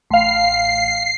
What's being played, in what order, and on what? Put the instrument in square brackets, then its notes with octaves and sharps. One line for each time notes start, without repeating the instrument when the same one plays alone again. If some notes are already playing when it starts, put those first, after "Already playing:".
[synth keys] A1 F5 [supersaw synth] C7